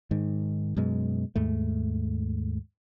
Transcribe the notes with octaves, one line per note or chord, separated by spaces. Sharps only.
G#2 D#3
F#2 B2 G#3
D#2 G#2 A3